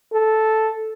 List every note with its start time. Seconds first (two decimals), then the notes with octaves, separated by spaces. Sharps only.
0.13 A4